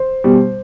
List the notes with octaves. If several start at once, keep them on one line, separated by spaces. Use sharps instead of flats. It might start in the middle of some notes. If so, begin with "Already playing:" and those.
Already playing: C5
B2 G3